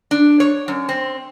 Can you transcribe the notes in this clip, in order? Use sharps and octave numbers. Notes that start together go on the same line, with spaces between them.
D4
C#5
F#2
C4